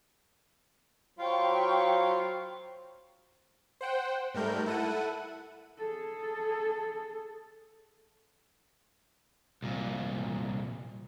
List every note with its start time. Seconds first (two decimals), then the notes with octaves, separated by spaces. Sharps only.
1.19 F#3 F4 C5 F5 G5 B5 C#6
3.81 C5 F#5 G5
4.34 G#2 G3 A3 A#4 G6
4.66 E4 A4 F#5 D#7
5.78 G#4 A4
9.62 C2 A#2